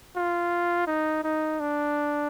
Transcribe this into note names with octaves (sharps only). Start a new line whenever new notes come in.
F4
D#4
D#4
D4